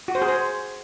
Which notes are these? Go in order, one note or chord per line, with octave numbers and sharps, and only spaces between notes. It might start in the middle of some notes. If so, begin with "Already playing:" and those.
F#4
C5
G#4
C5